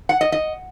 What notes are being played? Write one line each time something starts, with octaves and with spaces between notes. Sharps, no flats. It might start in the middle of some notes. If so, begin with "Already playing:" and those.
F#5
D#5
D#5